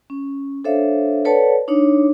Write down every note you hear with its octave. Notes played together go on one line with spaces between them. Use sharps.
C#4
D4 A4 C5 C#5 E5 F5
A4 B4 C#5 D5 F#5 A5
D4 D#4 C#5 D6